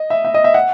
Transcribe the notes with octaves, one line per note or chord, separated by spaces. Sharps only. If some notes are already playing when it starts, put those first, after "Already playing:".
Already playing: D#5
E5
E5
D#5
E5
F#5